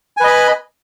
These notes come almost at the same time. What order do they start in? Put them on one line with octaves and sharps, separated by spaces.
G#5 B4 D#5 B5